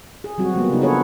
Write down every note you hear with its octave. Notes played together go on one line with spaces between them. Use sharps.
G#4
F#3 G3 C4 F#4
F3 G3 A#3 B3
C#3 D#4
D4 F4 G#4 A4 B4 C#5